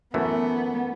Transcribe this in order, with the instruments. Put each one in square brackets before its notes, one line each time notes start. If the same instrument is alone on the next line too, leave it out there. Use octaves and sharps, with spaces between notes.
[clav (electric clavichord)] F#2 E3 A3 [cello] B3